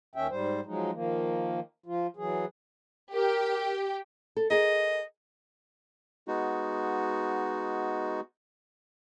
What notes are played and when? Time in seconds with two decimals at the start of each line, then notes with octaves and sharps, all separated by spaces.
0.16 D#2 D#3 C#4 E5 G5
0.30 G#2 G3 C5
0.65 F3 F#3 G#3 D#4
0.92 D#3 F3 A#3
1.86 F3 F4
2.17 E3 F#3 G#4
3.13 G4 A#4 G5
4.37 A4
4.50 G#4 A#4 D#5
6.28 G#3 B3 D#4 F#4